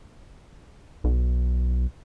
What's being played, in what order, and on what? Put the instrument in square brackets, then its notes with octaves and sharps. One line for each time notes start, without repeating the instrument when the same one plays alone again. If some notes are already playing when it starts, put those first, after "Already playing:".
[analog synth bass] B1